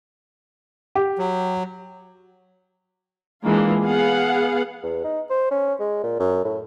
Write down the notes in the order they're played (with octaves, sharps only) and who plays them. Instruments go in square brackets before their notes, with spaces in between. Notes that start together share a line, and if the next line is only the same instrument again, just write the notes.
[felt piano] G4
[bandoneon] F#3
[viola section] E3 G#3 A#3 D4 F4
B3 G#4 F5 F#5
[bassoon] E2
D#4
C5
C#4
G#3
A#2
F#2
A2